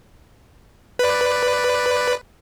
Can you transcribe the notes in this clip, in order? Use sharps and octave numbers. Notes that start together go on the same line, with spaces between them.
B4 D5